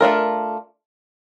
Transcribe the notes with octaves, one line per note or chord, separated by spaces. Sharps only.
A3 D4 F4 A#4